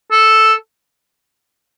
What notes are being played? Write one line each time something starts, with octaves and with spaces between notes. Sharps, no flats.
A4